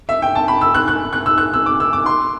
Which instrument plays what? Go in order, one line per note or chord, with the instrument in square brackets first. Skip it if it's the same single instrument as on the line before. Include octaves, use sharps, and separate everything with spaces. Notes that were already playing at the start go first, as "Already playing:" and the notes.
[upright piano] E5
G5
A5
B5
E6
F#6
F#6
F#6
E6
F#6
E6
D6
E6
D6
C6